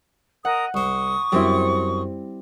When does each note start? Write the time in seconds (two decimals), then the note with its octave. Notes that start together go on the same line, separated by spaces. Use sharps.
0.45 A#4 D#5 F#5 D#6
0.74 C2 C5 C#6 D#6
1.32 F#2 G3 C4 E4